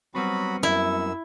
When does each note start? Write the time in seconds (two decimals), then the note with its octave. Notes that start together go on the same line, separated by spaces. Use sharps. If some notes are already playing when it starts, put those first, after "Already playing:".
0.15 F#3 G3 B3 C4 F#4 B5
0.63 F#2 E4 E6